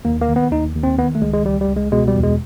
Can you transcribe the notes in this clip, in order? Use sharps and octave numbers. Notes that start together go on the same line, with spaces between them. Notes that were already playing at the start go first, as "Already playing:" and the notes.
D#2 A#3
A#3
D#3
B3
D#2 D#4
D#2
C4
D#3 B3
A3
C#2 G#3
G#3
C#2 G3
G3
C#2
G#3
B2 G#3
G3
E2
G#3